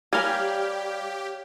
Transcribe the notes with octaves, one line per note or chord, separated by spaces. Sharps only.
G3 G4 A#4 C#5 F5 G#5 F6 G#6